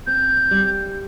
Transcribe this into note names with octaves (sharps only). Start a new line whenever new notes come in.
C4 G6
G3